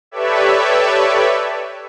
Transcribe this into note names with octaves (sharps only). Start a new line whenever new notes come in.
G4 A4 B4 C#5 D5 E5